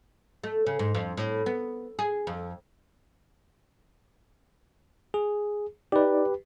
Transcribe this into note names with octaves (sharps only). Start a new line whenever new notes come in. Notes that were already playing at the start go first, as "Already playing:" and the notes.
A3
C#3
G#2
F2
A2
B3
G#4
F2
G#4
D#4 G4 B4 D5